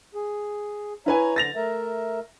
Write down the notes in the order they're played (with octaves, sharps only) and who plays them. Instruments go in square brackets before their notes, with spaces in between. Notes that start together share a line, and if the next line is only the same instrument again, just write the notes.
[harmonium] G#4
[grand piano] E4 B4 G#5 [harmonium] C#5 A#5
[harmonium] D3 [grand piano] A6 A#6 F7
[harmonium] A3 A#4 E5